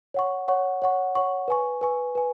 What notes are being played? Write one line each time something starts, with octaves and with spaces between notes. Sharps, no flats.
C#5 F#5 C#6
C#5 F#5 C#6
C#5 F#5 C#6
C#5 F#5 C#6
B4 G#5 C#6
B4 G#5 C#6
B4 G#5